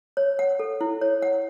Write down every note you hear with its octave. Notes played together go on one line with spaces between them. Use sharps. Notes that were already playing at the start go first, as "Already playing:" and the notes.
C#5
F#5
A4
E4
C#5
F#5